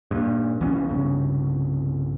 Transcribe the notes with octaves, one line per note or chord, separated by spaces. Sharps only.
G2 A#2
C2 E3 B3 C#4
C2 G2 C#3